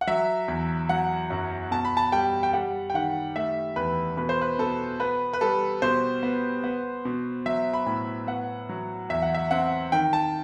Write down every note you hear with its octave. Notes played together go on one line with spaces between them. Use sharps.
F#5
F#3 E5
E2
F#3 F#5
F#2
B2 A5
B5
A5
G3 G5
G5
G3 F#5
G5
D#3 F#5
A3 E5
E2 B4
B2 B4
C5
B4
B2 A4
B3 B4
B4
G3 A4
B2 C5
B3
B3
B2
F#3 E5
B5
A2
B3 F#5
F#3
E2 E5
F#5
E5
C4 F#5
D#3 G5
A5